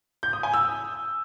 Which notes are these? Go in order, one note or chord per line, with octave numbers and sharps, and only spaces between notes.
G6
D#6
G#5
E6